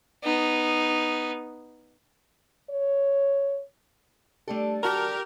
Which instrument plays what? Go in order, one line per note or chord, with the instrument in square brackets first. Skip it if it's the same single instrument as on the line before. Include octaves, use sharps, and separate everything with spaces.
[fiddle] B3 D#4
[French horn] C#5
[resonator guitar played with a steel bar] G3 D4 A4 [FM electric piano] A3 G4
[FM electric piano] F#4 A5 F6 [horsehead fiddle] G4 [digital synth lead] A#4